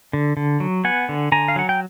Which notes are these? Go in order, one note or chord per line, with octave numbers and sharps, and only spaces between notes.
D3
D3
F#3
B3 F#5 G#5
D3
D3 G#5 A#5
F5
F#3 F#5
G5